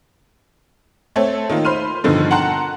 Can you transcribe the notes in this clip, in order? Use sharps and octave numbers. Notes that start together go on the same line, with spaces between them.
A3 C4 A4 C#5
D#3 A#3 F4
C5 B5 C6 F6 D#7
G2 B2 D3 D#3 F3
F#5 G5 A5 A#5 C6 F#6